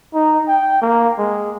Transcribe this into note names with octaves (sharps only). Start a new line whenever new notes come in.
D#4
G5
A#3
G#3